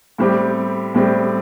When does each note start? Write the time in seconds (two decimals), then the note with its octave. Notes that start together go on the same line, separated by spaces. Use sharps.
0.18 A2 G3 C4 G4
0.95 A2 G3 C4 G4